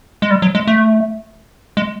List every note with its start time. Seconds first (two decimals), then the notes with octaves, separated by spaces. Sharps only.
0.22 G#3
0.31 G3
0.42 F#3
0.55 G#3
0.67 A3
1.77 G#3